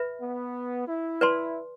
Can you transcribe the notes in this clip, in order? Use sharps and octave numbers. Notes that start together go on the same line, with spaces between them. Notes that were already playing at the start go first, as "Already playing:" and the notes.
Already playing: B4 E5 B5
B3
E4
B4 D5 A5 C6